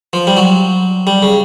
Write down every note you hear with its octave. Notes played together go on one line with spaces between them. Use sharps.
F3
G3
F#3
G3
C#3